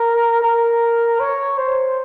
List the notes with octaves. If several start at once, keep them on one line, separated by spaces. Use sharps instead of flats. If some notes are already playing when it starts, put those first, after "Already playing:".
Already playing: A#4
A#4
C#5
C5